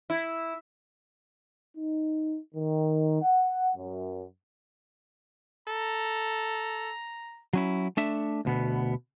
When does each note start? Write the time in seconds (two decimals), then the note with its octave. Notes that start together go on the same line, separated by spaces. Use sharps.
0.10 E4
1.77 D#4
2.55 D#3
3.23 F#5
3.76 F#2
5.68 A4 A#5
7.53 F#3 C#4 E4
7.97 A3 D4 E5
8.45 D2 B2 B3